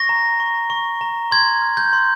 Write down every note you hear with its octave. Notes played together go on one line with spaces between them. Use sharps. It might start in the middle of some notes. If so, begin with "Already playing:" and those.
Already playing: C#6 A#6
A#5
C#6
C#6
A#5
C6 G#6
F6
G6
C6